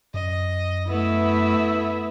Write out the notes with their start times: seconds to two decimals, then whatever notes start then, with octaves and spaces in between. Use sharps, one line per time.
0.14 F#2 D#5
0.89 A3 B3 E4 E5